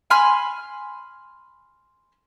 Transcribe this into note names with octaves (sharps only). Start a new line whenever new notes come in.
G#5 B5 C6 F6